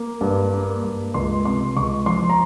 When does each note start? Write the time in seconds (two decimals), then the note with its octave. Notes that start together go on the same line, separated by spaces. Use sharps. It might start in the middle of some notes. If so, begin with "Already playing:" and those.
Already playing: A#3
0.21 G2
0.53 A#3
0.84 G2
1.14 C#2 C6
1.45 C3 C6
1.77 C#2 C#6
2.06 F3 C6
2.29 A#5